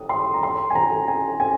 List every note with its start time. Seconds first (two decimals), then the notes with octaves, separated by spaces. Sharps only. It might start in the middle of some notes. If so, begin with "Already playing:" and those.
Already playing: D#6
0.09 C6
0.34 A#5
0.43 C6
0.70 G#5
0.75 A#5
1.08 G#5
1.40 G#5